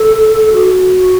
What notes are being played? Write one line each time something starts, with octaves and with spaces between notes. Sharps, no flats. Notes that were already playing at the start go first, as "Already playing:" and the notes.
Already playing: A4
F#4